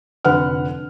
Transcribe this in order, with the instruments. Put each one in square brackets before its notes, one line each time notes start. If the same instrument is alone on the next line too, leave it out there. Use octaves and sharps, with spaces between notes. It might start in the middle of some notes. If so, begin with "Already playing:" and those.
[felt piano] F1 D3 B4 F#5 F6